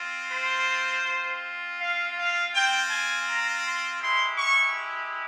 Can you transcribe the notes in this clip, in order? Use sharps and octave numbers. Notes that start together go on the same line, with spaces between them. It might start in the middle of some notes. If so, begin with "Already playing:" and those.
Already playing: C4 F4
C5
C4 F4
F5
F5
C4 F4 G5
G#5
A#5
C6
G#3 E4 G4 C6
C#6